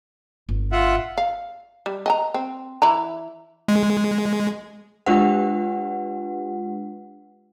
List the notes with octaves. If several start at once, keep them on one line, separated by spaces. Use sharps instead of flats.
G1
F4 E5 F#5
F5
G3
D#5 G#5 A#5
C4
E3 E4 A#5
G#3
G#3 D4 F4 G4 B4 F#5